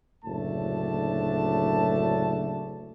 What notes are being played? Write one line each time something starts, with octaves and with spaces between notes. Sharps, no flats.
F#1 D2 A2 A3 D4 A5